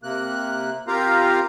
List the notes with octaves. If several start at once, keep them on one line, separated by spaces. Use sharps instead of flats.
C3 A#3 F#6
C4 F4 G4 A#4 F5 A#5